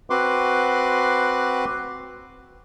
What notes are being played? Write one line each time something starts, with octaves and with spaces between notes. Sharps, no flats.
C4 F#4 B4 C6 D6